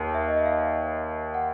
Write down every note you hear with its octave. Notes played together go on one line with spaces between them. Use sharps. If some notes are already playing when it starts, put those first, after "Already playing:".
Already playing: D#2
E5
D#5
E5
F5
F#5